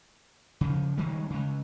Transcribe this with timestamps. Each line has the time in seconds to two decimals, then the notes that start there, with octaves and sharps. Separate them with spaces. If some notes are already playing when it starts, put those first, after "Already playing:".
0.61 C#3 F3
0.97 D#3 G3 G#3
1.30 C#3 G#3